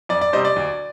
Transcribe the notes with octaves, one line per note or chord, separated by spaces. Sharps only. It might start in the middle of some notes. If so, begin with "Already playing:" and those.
F2 D5
D5
C3 G3 C5 D#5
D5
D2